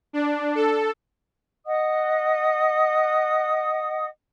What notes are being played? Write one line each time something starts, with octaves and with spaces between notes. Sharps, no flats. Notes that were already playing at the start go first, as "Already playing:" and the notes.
D4
A4
D#5 F#5 D#6